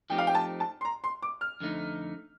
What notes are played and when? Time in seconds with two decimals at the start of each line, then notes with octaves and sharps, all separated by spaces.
0.10 F3 A3 C4 D#4 G4 G5
0.18 F5
0.27 G5
0.35 A5
0.60 A5
0.81 C6
0.85 A#5
1.04 C6
1.22 D6
1.41 F6
1.60 F2 D3 A3 D#4